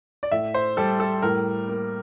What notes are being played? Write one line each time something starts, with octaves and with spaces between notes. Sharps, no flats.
D5
A2 E5
C5
G3 A4
A4
A2 A#4
A#3